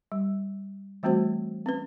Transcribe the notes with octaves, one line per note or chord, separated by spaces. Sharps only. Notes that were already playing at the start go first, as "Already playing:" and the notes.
G3
E3 G3 A3 C4 F#4 C5
C4 C#4 B4